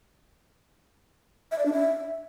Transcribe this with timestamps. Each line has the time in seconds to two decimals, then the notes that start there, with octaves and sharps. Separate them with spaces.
1.52 E5
1.59 D5
1.66 D4
1.73 E5